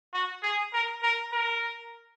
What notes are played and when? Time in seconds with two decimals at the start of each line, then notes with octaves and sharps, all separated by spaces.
0.13 F#4
0.43 G#4
0.73 A#4
1.02 A#4
1.32 A#4